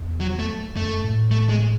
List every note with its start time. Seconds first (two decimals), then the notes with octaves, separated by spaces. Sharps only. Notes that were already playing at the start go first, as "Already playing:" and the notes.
Already playing: E2
0.21 F#3
0.39 A3
0.76 F#2 A3
1.04 A2
1.31 A3
1.49 G#3